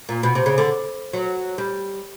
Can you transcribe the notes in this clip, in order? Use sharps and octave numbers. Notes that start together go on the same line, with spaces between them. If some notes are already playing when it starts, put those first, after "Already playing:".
A#2
B2
C3
C#3
D3
F#3
G3